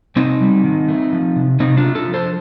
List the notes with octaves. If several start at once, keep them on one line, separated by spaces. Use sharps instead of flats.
C3 C4 D#4
G3
D#3
A3
F3
C3
C3 C4 D#4
D4 F4
A3
F4 A4
F3
A4 C5